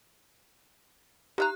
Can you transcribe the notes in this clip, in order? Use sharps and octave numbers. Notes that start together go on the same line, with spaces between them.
D#4 G4 E5 A#5 F#6